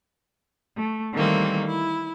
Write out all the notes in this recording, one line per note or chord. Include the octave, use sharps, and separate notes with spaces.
A3
D#3 E3 G3 A3 A#3 C4
E4